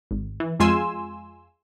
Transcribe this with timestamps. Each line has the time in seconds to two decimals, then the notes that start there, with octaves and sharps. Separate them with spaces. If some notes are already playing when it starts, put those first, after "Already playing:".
0.11 G#1
0.40 E3
0.60 F2 G#3 F4 G#5 C6 E6